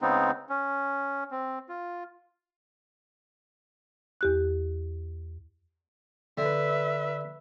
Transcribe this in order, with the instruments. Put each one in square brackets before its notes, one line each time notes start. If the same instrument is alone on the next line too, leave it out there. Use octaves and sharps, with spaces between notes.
[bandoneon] C#3 G#3 B3 C4 D#4
C#4
C4
F4
[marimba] E2 G4 F#6
[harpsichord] D3 [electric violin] B4 E5